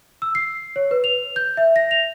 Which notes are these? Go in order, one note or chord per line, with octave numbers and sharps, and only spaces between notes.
E6
C7
C#5
B4
F7
G6
E5
A#6
F7